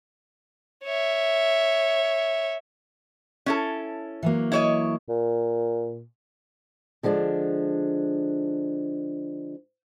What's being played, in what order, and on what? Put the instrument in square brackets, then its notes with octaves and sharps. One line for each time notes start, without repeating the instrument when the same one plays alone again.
[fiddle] C#5 E5
[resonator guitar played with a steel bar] C#4 E4 A4
[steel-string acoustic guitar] E3 F#3 A#3
[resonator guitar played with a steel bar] E4 C#5 D#5
[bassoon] A#2
[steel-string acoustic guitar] D3 F3 G#3 D4